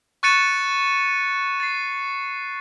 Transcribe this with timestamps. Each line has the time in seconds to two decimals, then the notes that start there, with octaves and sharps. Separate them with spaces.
0.23 C#6 F#6 A6 C#7 D#7 E7
1.60 A6 C7